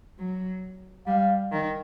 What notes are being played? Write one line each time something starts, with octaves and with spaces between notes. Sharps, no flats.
F#3
G3 F5
D#3